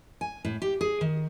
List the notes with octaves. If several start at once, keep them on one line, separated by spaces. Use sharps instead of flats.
G#5
A2
G4
G#4
D#3